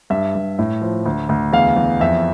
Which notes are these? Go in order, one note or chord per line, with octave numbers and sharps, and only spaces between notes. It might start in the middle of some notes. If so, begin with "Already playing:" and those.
G2 E5
G2
A2
F3
D2
D2
E2 F5
E2
F2 E5